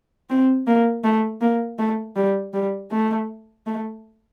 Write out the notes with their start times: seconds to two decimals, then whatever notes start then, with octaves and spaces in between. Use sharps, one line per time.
0.30 C4
0.67 A#3
1.04 A3
1.41 A#3
1.79 A3
2.16 G3
2.53 G3
2.91 A3
3.66 A3